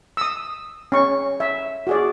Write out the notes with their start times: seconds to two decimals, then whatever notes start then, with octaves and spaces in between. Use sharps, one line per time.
0.17 D#6 E6
0.92 C#4 C#6
1.40 E5
1.87 F#4 G#4 D5